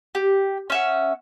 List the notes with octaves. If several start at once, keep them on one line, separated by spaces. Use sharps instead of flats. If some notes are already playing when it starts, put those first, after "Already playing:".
G4
C#4 E5 F#5